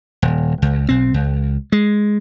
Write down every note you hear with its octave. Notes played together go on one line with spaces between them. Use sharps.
D#1
C#2
B1 C4
C#2
G#3